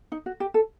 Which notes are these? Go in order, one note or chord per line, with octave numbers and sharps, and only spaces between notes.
D#4
F#4
G4
A4